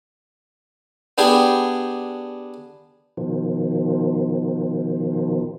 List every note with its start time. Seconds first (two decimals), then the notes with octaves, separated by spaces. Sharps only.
1.18 B3 D4 G4 G#4
3.17 B2 D#3 F3